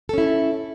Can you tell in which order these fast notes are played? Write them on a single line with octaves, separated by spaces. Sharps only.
A4 C#4 E4